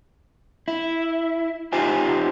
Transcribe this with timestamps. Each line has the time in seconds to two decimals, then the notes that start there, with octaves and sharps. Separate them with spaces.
0.68 E4
1.73 D#4 F4 G4 C5 G#5